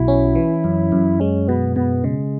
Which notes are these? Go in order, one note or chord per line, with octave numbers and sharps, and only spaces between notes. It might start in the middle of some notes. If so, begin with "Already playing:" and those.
Already playing: B1 B2 E4 F#4
C#4
E3
F#2
F#2
G#3 C#4
B2 B3
B2 B3
C#3 G#3